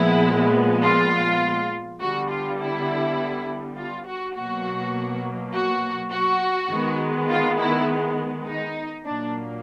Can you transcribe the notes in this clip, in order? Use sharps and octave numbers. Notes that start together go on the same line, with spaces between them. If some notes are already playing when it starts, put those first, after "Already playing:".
Already playing: A#2 F3 G#3 B3 E4
F4
D3 G3 B3 F#4
F4
E4
F4
F#4
B2 F#3 A#3 F#4
F#4
F#4
D#3 G#3 B3
F4
E4
D#4
A#2 F#3 A#3 D4